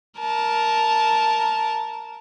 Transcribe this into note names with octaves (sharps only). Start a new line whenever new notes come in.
A#4 A5